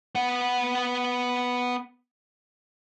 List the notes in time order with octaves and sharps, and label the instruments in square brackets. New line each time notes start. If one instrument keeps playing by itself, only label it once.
[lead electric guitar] B3 F#5